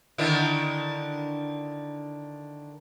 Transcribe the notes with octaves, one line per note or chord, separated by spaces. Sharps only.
D3 D#3 E4